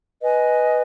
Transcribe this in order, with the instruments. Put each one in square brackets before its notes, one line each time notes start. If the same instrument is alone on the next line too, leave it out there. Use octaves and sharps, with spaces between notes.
[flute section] B4 D#5 G#5